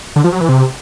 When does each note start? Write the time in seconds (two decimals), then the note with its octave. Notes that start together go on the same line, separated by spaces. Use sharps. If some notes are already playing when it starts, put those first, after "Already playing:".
0.16 D3
0.24 F3
0.32 F#3
0.41 E3
0.49 C3